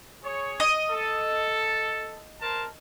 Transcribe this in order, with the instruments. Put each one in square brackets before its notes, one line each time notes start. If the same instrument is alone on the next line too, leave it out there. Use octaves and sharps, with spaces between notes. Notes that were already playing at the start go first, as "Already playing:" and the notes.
[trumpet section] G#4 C#5
[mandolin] D#5
[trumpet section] A4
A#4 C5 A5